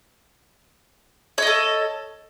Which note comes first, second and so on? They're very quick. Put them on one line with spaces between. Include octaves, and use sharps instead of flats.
C#5 D#5 A4